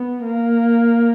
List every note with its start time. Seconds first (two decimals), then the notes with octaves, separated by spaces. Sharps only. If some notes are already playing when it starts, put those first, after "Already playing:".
Already playing: B3
0.25 A#3